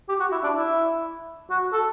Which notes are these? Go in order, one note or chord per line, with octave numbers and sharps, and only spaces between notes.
G4
F#4
E4
D4
E4
F#4
A4